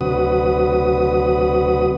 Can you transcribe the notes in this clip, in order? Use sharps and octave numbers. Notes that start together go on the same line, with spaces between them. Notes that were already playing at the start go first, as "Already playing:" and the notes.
D2 C3 F#3 F#4 B4 D#6